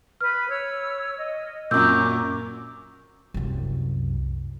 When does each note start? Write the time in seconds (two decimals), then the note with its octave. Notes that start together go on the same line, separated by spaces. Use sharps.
0.21 B4 F6
0.49 C#5 E6
1.18 D#5
1.71 F#2 A#2 A#4 C#6 D6 E6 G6
3.34 C2 F#2